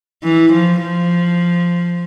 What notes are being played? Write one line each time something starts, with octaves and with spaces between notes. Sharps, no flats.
E3
F3
F3